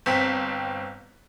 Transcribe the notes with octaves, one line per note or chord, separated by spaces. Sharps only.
G1 C4 B6